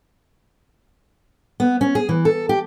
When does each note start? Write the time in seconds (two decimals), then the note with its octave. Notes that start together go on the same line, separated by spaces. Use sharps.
1.60 B3
1.81 C#4
1.95 G#4
2.09 E3
2.25 A4
2.49 G4